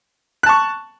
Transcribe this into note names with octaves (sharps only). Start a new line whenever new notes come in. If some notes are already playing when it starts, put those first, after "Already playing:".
A5 C#6 F#6